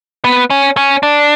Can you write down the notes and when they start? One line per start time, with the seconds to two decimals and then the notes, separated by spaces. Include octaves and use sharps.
0.25 B3
0.50 C#4
0.77 C#4
1.03 D4